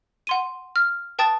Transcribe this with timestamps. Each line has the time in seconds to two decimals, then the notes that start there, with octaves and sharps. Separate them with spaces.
0.27 F#5 C6 D#7
0.76 F6
1.19 B4 G5 A5 D#6 A6